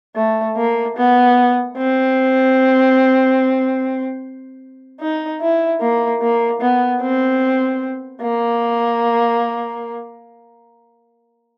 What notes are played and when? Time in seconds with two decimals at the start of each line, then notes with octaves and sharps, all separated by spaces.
0.16 A3
0.57 A#3
0.97 B3
1.77 C4
5.01 D#4
5.41 E4
5.81 A#3
6.21 A#3
6.61 B3
7.01 C4
8.22 A#3